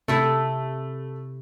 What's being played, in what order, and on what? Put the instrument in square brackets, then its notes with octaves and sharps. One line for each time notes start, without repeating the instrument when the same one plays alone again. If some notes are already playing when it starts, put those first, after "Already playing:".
[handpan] C3 [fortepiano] A3 [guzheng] E4 A4